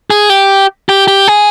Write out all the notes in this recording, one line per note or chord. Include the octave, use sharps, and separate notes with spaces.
G#4
G4
G4
G4
G#4